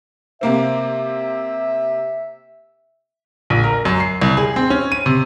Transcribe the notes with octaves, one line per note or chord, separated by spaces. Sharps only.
C3 A#3 C4 E5
A#1
A#4
F#2
C7
C2
G#4
C4
C#4
D#7
C3